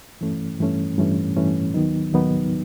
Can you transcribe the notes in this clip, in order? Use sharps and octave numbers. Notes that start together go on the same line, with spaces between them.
G2 E3 A3 C#4
G2 E3 A3 C#4
G2 E3 A3 C#4
G2 E3 A3 C#4
D#2 D#3 F#3 B3 D#4
D#2 D#3 F#3 B3 D#4